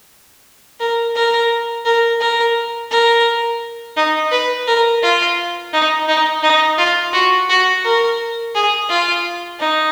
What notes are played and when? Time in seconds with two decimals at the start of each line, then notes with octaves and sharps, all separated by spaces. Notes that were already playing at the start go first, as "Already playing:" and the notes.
0.80 A#4
1.16 A#4
1.86 A#4
2.21 A#4
2.91 A#4
3.97 D#4
4.32 B4
4.68 A#4
5.03 F4
5.73 D#4
6.08 D#4
6.43 D#4
6.78 F4
7.13 F#4
7.50 F#4
7.85 A#4
8.55 G#4
8.90 F4
9.60 D#4